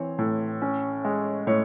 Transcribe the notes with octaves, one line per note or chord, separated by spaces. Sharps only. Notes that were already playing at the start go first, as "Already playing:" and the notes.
Already playing: E3 C4 C#5
A2
C#4
G#3
A2 C#5